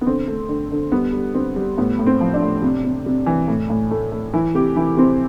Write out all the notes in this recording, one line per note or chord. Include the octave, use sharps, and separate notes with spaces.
B3
D3 C4
A3
D3
D3
G3 B3
G3
D3 C4
G3
A2 B3
A2
C4
F3
D4
A2
C3
C3
C3
E3
A2
A2
A3
A3
E3 E4
C3 G4
E3 E4
C3 C4